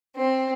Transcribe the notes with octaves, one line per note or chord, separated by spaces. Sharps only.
C4